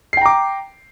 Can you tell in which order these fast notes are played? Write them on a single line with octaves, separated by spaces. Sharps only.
C7 G5 A#5 D6